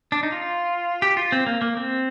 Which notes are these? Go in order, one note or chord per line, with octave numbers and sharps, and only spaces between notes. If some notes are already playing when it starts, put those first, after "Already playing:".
D4
D#4
F4
G4
F4
C4
A#3
A#3
C4